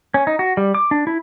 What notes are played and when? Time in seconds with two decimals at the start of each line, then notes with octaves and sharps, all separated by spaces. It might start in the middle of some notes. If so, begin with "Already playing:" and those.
0.14 C#4
0.27 D#4
0.39 F#4
0.57 G3
0.75 D6
0.91 D4
1.07 E4